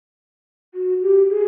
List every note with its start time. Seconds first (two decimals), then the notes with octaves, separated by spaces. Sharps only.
0.74 F#4
1.02 G4
1.29 G#4